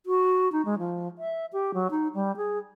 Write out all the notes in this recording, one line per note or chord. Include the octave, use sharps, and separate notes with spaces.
F#4
D#4
G#3
F3
E5
G4
F#3
D#4
G3
G#4